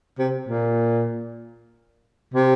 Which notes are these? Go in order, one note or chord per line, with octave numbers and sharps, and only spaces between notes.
C3
A#2
C3